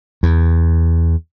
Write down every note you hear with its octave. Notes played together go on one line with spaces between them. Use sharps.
E2